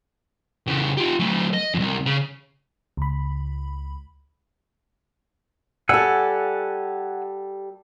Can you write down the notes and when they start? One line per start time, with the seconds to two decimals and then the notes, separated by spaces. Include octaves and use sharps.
0.67 C#3 E3
0.97 F4 G4
1.20 F#3 A3
1.54 D#5
1.74 C2 F2
2.06 C#3
2.97 C#2 B5
5.89 G3 A4 F#5 G#5 E6